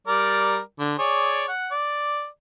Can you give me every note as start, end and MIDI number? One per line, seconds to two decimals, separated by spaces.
0.07 0.59 55
0.07 0.59 70
0.07 0.59 74
0.80 0.96 50
0.99 1.49 68
0.99 1.49 73
0.99 1.49 74
1.49 1.70 78
1.71 2.27 74